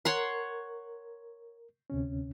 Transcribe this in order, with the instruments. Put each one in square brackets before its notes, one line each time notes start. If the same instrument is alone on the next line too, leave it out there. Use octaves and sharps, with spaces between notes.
[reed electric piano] A#4 [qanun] C#5 F#5 C6
[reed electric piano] D2 C3 C#4